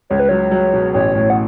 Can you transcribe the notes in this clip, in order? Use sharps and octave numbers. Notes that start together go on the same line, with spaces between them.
C#2 C#5
B4
F#3 C#5
F#3
B2
A1 C#5
A2
F#5